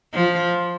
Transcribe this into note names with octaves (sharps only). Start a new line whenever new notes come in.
F3